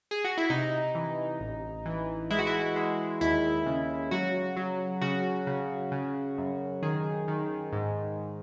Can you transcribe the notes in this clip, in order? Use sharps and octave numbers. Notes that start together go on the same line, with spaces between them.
G#4
F#4
E4
C3 D#4
E3
A1
E3
G#3 E4
F#4
E4
G#3
D#2 E4
C#3
F#3 F#4
F#3
C#3 F#4
C#3
C#3
F#2
D#3 G#4
D#3
G#2